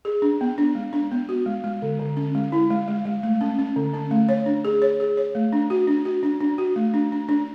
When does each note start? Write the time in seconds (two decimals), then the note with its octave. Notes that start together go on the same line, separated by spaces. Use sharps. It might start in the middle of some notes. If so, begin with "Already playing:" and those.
0.05 G#4
0.22 D4
0.41 B3
0.58 D4
0.75 G#3
0.93 D4
1.12 B3
1.29 F#4
1.46 G#3
1.64 G#3
1.82 D3
1.99 D3
2.17 C#4
2.35 G#3
2.52 E4
2.70 G#3
2.88 G#3
3.05 G#3
3.23 A3
3.41 C#4
3.59 C#4
3.76 D3
3.94 C#4
4.11 A3
4.29 C#5
4.46 D4
4.65 G#4
4.82 C#5
5.00 G#4
5.17 C#5
5.35 A3
5.53 D4
5.70 F#4
5.87 D4
6.05 F#4
6.23 D4
6.41 D4
6.58 F#4
6.76 A3
6.94 D4
7.12 D4
7.29 D4